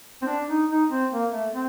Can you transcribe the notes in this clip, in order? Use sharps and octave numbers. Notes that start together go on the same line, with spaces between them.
C4
D4
D#4
D#4
C4
A#3
A3
C4